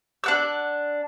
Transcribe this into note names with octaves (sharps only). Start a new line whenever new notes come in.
D4 F#5 E6